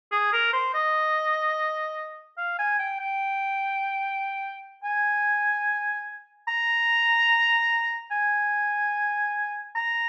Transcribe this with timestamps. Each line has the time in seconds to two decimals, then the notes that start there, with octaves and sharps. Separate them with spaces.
0.12 G#4
0.33 A#4
0.53 C5
0.74 D#5
2.38 F5
2.58 G#5
2.79 G5
2.99 G5
4.84 G#5
6.48 A#5
8.11 G#5
9.75 A#5